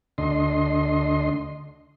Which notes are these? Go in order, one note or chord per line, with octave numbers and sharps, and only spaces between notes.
D2 D3 D#5 C6